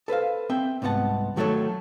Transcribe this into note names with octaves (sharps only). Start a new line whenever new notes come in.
A4 B4 C5 F5
C4 E5 G5
C2 G#2 B3 F#5 A5
D#3 F#3 A3 B3 A4 C#5